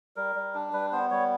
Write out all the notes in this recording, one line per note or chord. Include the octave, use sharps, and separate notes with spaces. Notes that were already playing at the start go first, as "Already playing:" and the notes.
G3 A#4
G3
D4
G3 B4
B3 C5
G3 C#5